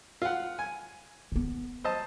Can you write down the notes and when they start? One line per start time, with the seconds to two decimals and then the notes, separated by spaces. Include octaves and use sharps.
0.22 F4 F#5
0.59 G#5
1.32 D3 B3
1.84 C5 D#5 A5